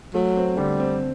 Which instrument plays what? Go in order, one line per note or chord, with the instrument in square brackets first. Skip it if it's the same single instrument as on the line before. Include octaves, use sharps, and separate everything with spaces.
[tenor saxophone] F#3 [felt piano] A3
[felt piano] C4
[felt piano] D3 [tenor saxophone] G3
[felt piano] C4